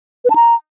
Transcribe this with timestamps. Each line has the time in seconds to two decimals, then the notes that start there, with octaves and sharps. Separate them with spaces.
0.25 B4
0.30 A5
0.36 A#5